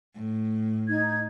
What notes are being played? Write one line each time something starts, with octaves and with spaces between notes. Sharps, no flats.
A2
D#4 G#6